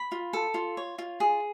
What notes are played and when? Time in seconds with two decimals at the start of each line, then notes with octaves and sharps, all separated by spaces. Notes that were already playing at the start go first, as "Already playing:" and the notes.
Already playing: B5
0.12 F4
0.33 A4
0.54 F4
0.77 C#5
0.98 F4
1.20 G#4